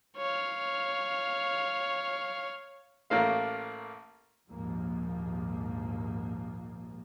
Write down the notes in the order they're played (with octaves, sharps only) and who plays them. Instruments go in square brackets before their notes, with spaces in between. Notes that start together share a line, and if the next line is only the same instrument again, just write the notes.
[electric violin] C#5 F5
[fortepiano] A1 A3 A#3 F5
[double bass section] A#1 D#2 G#2 F3 A#3